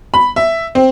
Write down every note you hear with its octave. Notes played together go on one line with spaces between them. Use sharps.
B5
E5
C4